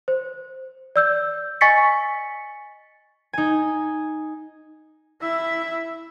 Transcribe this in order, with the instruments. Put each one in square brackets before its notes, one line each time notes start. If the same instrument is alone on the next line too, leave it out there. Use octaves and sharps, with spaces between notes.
[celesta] C5
D5 E6 G6
D#5 G#5 C#6 A6 B6 C#7
[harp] D#4 G#5
[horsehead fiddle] E4 E5